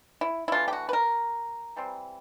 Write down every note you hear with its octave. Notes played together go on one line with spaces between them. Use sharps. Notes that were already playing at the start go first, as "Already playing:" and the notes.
E4
E4
E3 A3 D4 F4
G4
F#4
B4
A#4
E3 G3 C4